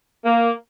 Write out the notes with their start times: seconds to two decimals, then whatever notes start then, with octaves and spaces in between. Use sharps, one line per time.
0.24 A#3